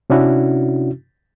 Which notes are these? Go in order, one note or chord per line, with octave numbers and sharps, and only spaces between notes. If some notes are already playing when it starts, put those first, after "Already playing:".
C3 C#4 D4 E4 F#4